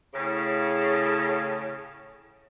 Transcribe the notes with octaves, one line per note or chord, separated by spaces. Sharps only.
A2 C#3